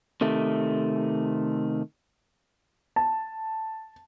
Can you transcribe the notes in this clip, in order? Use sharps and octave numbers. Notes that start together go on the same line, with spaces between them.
C3 D#3 A3
A5